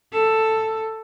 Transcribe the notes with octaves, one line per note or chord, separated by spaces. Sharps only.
A4